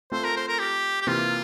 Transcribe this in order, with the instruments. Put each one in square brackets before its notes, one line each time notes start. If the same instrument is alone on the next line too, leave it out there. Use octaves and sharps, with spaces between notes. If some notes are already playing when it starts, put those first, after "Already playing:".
[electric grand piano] A3 C4 F4 A4 [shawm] C5
[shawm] A#4
C5
A#4
G4
G4
[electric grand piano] C3 E3 A#3 [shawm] F4